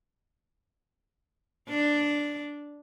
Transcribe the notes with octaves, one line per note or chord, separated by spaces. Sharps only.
D4